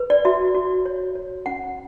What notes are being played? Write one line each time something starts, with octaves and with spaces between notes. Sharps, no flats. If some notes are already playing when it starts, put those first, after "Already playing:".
Already playing: B4
D5
F#4 E5
F#4
C#5
C#5
C#4 F#5